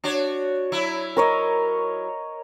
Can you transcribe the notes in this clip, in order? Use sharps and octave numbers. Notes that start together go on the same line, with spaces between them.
D4 F#4 C#5
F#3 E4
A#4 C#5 D#5